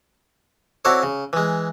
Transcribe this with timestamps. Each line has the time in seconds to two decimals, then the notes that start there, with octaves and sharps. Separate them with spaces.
0.85 C4 E4 F#4 A4 C#5 D5
1.03 C#3
1.33 E3 G#3